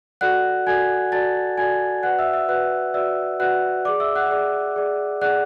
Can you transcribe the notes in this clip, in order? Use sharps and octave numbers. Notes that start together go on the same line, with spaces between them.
F#4 A4 D5 F#5 F#6
F#4 A4 D5 G#5 G#6
F#4 A4 D5 A5 A6
F#4 A4 D5 G#5 G#6
F#4 B4 D5 F#5 F#6
E5 E6
E5 E6
F#4 B4 D5 F#5 F#6
F#4 B4 D5 E5 E6
F#4 B4 D5 F#5 F#6
G#4 D5 D6
E5 E6
F#5 F#6
G#4 D5
G#4 D5
G#4 D5 F#5 F#6